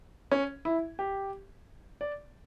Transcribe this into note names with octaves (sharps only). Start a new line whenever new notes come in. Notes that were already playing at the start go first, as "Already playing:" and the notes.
C#4
E4
G4
D5